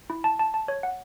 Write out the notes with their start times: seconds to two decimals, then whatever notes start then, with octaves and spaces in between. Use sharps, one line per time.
0.10 E4
0.24 A5
0.39 A5
0.54 A5
0.68 C#5
0.83 F#5